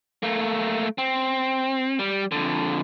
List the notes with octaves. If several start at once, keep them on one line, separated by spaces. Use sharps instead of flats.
A3 A#3
C4
G3
F2 D3